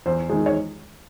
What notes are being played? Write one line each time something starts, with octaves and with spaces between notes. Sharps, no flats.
E2 C5
D#3 G#3
C#5